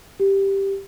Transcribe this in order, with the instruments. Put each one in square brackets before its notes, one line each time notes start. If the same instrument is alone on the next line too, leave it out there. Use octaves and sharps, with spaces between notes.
[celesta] G4